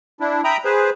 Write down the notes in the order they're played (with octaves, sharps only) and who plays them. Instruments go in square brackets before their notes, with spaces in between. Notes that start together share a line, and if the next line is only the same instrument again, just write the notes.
[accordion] D4 E4
E5 G5 A#5 B5 D#6
G#4 B4 C5